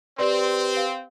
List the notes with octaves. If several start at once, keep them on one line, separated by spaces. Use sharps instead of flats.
C4 G4 B4 D5 C6
F5